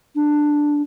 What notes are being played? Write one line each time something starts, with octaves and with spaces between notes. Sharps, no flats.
D4